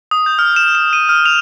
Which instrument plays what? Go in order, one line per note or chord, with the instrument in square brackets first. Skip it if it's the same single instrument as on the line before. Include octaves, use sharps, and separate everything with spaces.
[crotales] D#6
G6
F6
E7
E7
D#7
F6
F7